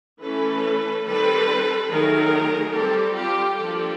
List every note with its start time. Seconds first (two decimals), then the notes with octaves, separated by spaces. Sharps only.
0.22 E3 A3 C#4 A4 B4
1.05 D#3 G3 C4 A4 B4
1.89 D#3 F#3 A3 G#4 A#4
2.73 G3 C4 G4 A4
3.15 F4 G4
3.57 F3 A#3 D4 G4 A4